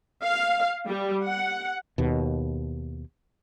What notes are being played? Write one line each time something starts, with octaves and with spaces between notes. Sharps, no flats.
F5
G3
F#5
D#2 B2